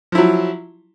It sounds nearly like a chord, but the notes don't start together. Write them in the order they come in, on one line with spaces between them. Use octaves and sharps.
F3 E4 F#3